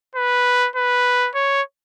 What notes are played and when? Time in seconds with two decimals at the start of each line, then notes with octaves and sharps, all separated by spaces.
0.15 B4
0.76 B4
1.35 C#5